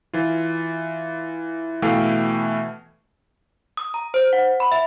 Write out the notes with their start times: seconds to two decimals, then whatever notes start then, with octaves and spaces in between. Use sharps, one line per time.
0.13 E3 F4
1.82 B2 E3 A3 F5 G5
3.77 D#6
3.94 A#5
4.14 C5
4.33 F#5
4.60 B5
4.72 E5